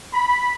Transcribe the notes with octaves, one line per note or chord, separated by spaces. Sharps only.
B5